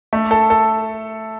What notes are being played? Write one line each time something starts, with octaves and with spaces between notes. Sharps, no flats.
A3
A4
A4